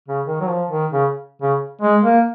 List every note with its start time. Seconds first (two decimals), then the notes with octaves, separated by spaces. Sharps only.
0.08 C#3
0.26 D#3
0.41 F#3
0.48 F3
0.71 D#3
0.93 C#3
1.42 C#3
1.81 G#3
2.04 A#3